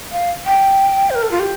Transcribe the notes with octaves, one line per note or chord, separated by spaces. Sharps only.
F5
G5
C5
A#4
A4
F4
G4